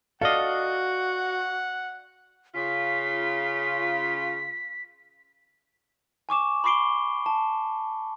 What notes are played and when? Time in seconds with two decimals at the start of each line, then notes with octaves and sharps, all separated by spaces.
0.22 F#4 A4 D5 D#5 F5 F#5
2.55 C#3 F4 B6
6.29 G#5 C#6 D6 E7
6.64 B5 C#6 D6 C7 D7 G7
7.26 A5